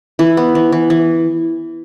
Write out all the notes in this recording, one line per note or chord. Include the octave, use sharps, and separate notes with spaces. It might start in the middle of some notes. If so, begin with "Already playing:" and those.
E3 E4
B3
E3
E3
E3